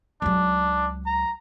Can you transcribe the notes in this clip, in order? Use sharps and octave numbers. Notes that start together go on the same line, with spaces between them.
C#2 F#3 D4
A#5